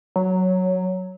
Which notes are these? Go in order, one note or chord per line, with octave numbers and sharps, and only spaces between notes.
F#3